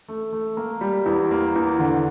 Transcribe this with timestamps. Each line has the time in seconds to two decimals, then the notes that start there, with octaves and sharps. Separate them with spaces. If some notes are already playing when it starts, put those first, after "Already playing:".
0.08 A3
0.33 A3
0.57 A#3
0.81 G3
1.06 E2
1.31 A#3
1.56 E2
1.79 D3